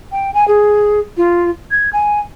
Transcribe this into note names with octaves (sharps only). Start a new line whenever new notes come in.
G5
G#5
G#4
F4
G#6
G#5